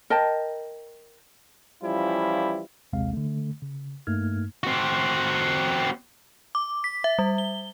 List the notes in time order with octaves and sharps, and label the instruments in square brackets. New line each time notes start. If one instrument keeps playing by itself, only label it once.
[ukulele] A#4 D#5 G5 A5
[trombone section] E3 F3 G3 C#4 E4 F4
[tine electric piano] A#1 D#2 C3 G#3 C4 F5
D3 A3
C#3
G2 A3 A#3 D#4 F6 G#6
[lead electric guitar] C4 F#4
[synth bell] D6
B6
E5
G3
G7